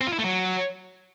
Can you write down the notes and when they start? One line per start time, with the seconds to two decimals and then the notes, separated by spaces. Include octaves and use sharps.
0.01 C4
0.07 F4
0.13 E4
0.18 A3
0.24 F#3